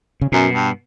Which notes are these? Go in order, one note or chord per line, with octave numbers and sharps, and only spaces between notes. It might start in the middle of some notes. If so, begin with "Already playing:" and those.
C#3
F#2 B2
G2